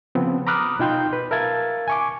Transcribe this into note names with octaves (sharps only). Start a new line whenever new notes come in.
C#3 F3 B3 C4
A#5 B5 D6 D#6 F6 F#6
B2 D#4 F4 G5 C6 G6
B4
A#4 E5 F5 A5 G#6 A6
G#5 C#6 D6